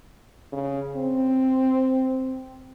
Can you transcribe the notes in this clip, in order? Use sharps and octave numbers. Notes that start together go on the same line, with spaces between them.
C#3
C4